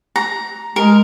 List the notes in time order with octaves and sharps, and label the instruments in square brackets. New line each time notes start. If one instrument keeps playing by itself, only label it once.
[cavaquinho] A#5
[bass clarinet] G#3 [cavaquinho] A#4